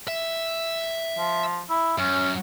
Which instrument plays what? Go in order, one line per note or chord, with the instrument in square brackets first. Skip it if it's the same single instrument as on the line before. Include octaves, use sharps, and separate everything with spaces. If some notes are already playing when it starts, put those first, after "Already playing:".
[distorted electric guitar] E5
[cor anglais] F3
E4
[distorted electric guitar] F#2 [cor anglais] C#4